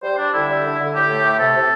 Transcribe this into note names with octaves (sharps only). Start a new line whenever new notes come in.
G3 C5
G3 D4
D3 E4
G3
D3
D3
A2 G4
A3
A2
C3 A4
C3